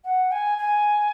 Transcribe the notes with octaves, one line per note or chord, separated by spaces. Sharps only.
F#5
G#5
G#5